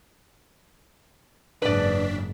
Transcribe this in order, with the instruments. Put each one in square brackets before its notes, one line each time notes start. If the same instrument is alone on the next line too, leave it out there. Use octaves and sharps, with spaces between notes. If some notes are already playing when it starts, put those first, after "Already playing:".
[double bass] F#1 G#2 [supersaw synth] D4 B6 [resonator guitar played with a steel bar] B4 D5